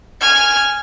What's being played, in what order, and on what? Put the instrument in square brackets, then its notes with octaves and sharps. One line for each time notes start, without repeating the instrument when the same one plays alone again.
[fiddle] G#5 F6